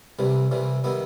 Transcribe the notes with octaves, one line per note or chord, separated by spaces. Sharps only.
C2 C3 E3 G3
C2 C3 E3 G3
D#3 G3 B3 E4